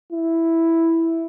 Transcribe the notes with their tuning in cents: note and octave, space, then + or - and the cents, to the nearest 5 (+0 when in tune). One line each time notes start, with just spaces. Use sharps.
E4 +0